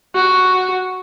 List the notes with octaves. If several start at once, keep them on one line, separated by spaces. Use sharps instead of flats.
F#4